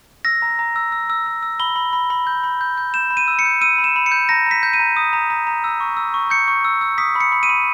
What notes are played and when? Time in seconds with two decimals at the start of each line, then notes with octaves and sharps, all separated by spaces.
0.25 E6 A#6
0.42 A#5
0.59 A#5
0.76 E6
0.92 E6
1.10 E6
1.26 E6
1.43 E6
1.60 B5 G7
1.76 B5
1.93 B5
2.10 B5
2.27 G6
2.44 B5
2.61 G6
2.78 G6
2.94 G6 E7
3.10 B5
3.17 D#7
3.28 E6
3.39 C#7
3.45 G6
3.61 E6 D#7
3.78 B5
3.84 E7
3.96 B5
4.06 C#7
4.12 G6
4.29 A#5 A#6
4.46 A#5 B6
4.63 G6
4.73 D#7
4.79 A#5
4.96 D#6
5.13 A#5
5.30 A#5
5.47 A#5
5.64 E6
5.80 C#6
5.97 E6
6.14 C#6
6.30 G6 C#7
6.48 C#6
6.65 E6
6.81 E6
6.98 D#6 B6
7.15 B5
7.20 C#7
7.32 B5
7.43 D#7
7.49 B5